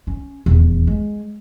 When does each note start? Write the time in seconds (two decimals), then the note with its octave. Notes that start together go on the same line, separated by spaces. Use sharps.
0.07 C#4
0.46 D#1 E2
0.87 G#3